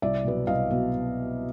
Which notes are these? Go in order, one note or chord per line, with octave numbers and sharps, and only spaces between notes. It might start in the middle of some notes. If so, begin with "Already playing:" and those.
C2 D5 E5
B2 F#3 B3
C2 D#5 F5
B2 F#3 B3